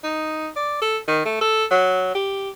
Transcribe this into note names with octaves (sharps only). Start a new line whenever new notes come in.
D#4
D5
A4
D#3
A3
A4
F#3
G4